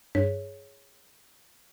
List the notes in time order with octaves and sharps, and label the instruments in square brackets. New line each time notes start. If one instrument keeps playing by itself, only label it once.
[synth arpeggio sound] G2 [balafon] G#4 C#5